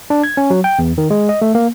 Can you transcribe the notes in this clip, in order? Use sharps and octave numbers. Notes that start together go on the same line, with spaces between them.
D4
G#6
C#4
F#3
G5
E2
D#3
G#3
D#5
A3
A#3